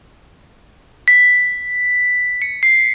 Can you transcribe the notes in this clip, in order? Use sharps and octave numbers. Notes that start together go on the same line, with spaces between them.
B6
C#7
C7